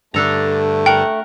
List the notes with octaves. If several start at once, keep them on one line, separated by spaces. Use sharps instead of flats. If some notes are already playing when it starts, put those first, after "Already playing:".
G2 D3 A3 D4 A4 A#5
A#4 F#5 G5